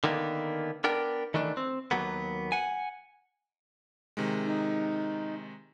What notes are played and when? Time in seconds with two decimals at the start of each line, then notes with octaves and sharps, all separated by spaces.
0.04 D3 D#3 A#3 B3
0.84 B3 D4 A#4 G5
1.34 D#3 E3 A3 D4
1.57 C4
1.91 D#2 F#3 A#3 B3
2.52 F#5 G#5
4.17 C3 D#3 G#3
4.46 D#4